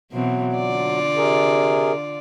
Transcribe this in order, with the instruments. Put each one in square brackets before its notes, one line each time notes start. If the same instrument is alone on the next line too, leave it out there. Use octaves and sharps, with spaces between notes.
[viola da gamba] B2 E3 C4 [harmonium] F#3
[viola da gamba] D3 F4 D5
[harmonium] C3 G#4 A#4